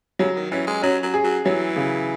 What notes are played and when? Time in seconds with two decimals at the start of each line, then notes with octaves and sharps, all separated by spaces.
0.19 C#3 F#3
0.36 D#3
0.51 E3 C#4
0.67 G#3
0.82 F#3 C#4
1.03 F#3
1.14 G#4
1.24 F#3
1.45 E3 F#3
1.76 C#3